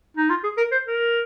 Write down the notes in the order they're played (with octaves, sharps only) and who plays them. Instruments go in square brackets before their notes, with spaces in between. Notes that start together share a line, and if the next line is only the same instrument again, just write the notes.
[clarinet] D#4
F4
G#4
A#4
C5
A#4